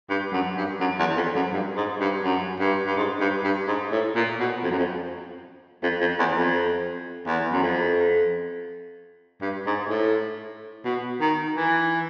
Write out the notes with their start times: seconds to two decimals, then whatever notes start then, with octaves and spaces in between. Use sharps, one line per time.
0.10 G2
0.33 F#2
0.57 G2
0.80 F#2
0.99 E2
1.17 F2
1.35 F#2
1.53 G2
1.76 G#2
2.01 G2
2.24 F#2
2.60 G2
2.87 G2
2.96 G#2
3.20 G2
3.44 G2
3.67 G#2
3.92 A2
4.16 A#2
4.40 B2
4.63 F2
4.71 F#2
4.78 F2
5.83 F2
6.00 F2
6.19 E2
6.37 F2
7.26 E2
7.52 F#2
7.63 F2
9.41 G2
9.66 G#2
9.89 A2
10.85 B2
11.21 D#3
11.56 E3